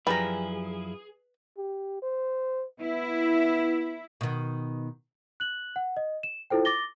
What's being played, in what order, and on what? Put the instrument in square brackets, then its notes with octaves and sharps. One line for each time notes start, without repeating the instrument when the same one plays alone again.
[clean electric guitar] F#2 F3 E4 [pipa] G3 A#5 [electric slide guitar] G#4 [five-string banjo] B4
[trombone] G4
C5
[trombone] B3 [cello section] E4
[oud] B2 D#3
[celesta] F#6 F#7
F#5
D#5
E7
E4 F4 A4 C5 G5
D6 A6 A#6 G7